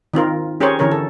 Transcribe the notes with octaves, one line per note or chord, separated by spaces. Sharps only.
D#3 C4 F4 A#4
C#4 G4 G#4 A#4 C5 C#5
D3 E3 C#4 A#4 C#5
A4